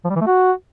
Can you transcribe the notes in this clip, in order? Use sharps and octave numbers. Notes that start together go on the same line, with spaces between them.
F3
G3
E3
A3
F#4